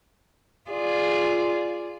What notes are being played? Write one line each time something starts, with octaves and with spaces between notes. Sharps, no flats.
F4 G#4 D5